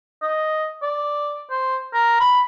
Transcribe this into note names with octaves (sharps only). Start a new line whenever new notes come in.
D#5
D5
C5
A#4
B5